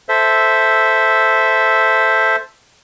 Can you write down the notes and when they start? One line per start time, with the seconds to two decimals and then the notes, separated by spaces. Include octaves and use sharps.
0.09 A4 C5 E5